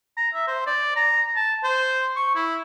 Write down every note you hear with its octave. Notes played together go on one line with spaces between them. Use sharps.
A#5
E5
C5
D5
A#5
A5
C5
C#6
E4